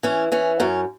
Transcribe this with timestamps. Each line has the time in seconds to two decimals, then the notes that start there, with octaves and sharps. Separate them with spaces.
0.03 E3 C#4
0.32 E3 C#4
0.60 F#2 C#4